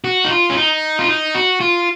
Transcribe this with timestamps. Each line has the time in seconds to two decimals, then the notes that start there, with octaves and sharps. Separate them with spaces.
0.04 F#4
0.25 D#4
0.30 F4
0.50 C#4
0.56 D#4
0.99 F4
1.08 D#4
1.35 F#4
1.60 F4